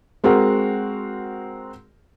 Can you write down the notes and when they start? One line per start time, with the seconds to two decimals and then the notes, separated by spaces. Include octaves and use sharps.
0.24 G#3 C4 F#4 A#4